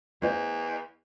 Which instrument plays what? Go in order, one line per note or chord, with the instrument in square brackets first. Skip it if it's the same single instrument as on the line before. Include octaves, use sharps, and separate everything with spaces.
[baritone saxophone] E2 [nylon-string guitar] C5 D#5 F5